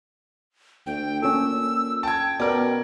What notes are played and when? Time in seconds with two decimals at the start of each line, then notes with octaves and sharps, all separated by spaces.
0.87 D2 G5
1.22 A#2 C#4 A4 E6
2.03 G5 A5 G#6
2.40 B2 A#4 D5